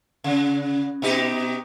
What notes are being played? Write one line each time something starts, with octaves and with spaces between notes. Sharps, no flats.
C#3
B2 D#4 G4